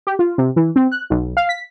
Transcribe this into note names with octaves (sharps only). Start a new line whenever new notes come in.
G4
F4
C3
E3
C4
F#6
B1
F5
B6